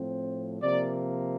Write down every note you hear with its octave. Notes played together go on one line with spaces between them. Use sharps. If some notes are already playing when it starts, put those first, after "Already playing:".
Already playing: A2 F3 C4
C3 F3 A#3 D5